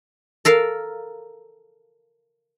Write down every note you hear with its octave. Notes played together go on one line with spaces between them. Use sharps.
A4 A#4 F5